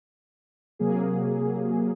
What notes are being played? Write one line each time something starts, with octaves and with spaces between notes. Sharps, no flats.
C3 F#3 A#3 G#4